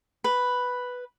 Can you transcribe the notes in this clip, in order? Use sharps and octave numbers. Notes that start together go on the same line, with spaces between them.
B4